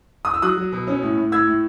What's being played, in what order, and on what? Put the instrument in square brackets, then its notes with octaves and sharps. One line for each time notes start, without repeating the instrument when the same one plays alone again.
[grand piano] D#6
E6
F#3 D#6 F#6
F#3
B2
C#4
A2
A2
A2 E6 G#6
A2